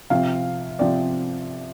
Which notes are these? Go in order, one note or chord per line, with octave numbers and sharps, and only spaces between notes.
C3 F3 C4 F5
C3 F3 C4 D5